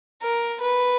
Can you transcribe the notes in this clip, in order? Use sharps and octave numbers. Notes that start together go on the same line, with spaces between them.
A#4
B4